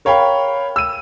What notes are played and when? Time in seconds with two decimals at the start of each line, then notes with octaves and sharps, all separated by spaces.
0.05 A#4 C#5 F5 G5 B5
0.76 E6 D#7